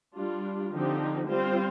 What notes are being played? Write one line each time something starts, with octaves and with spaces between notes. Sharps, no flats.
G3 D4 F4
D3 F3 C4 D#4 G4
G3 C4 F4 C5